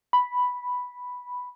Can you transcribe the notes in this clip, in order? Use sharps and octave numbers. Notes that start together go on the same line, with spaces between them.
B5